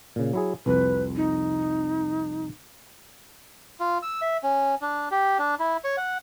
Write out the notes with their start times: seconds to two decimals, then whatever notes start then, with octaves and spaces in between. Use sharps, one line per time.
0.16 A#2 C#3
0.33 F#3 E4 G#4
0.66 C2 F2 B4
1.16 D#4
3.80 F4
4.03 E6
4.22 E5
4.43 C#4
4.82 D4
5.11 G4
5.39 D4
5.60 E4
5.84 C#5
5.97 F#5